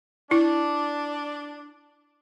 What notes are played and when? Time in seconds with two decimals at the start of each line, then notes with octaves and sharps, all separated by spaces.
0.31 D4 E4